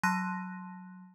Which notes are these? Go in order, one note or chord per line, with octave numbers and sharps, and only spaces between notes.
F#3 A5 C6 F#6 A#6 D#7